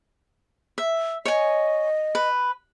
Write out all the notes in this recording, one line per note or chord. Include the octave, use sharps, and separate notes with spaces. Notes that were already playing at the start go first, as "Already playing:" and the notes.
E5
C#5 D#5 G#5
B4